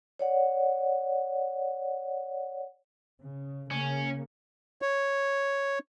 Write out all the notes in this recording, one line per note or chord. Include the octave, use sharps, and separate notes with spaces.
C#5 D5 F#5
C#3
C#3 A#3 C#4
C#5